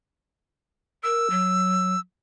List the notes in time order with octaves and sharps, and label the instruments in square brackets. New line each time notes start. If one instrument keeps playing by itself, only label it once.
[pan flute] A#4 [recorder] E6
[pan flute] F#3